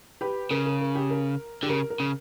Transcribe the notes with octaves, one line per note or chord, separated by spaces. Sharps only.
G4 B4
C#3 A#4
A#4
A#4
G4
A#4
D3 G4
C#3 A#4
A#4
C#3